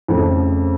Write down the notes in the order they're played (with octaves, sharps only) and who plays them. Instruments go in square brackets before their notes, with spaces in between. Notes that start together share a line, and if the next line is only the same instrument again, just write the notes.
[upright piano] F2 C#3 F3 A3